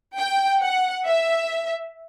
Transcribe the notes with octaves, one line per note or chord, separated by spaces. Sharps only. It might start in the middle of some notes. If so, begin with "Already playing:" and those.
G5
F#5
E5